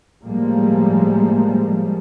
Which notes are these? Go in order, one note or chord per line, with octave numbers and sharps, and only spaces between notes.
A2 F3 G3 G#3 A#3